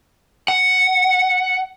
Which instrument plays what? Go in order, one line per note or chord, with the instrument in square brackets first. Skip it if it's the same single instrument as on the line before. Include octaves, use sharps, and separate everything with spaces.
[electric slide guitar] F#5